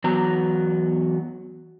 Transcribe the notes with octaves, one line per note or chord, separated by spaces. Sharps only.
E2 F#3 B3 A#5